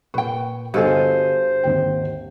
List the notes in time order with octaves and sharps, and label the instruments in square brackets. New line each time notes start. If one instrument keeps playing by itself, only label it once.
[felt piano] A#2 C#6 [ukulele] B4 G5
[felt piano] G1 D#5 [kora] G2 G#4 [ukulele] F#4 A4 [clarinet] C5
[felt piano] G#1 D#2 G5